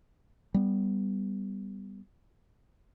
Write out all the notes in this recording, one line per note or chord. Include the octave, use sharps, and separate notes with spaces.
G3 B3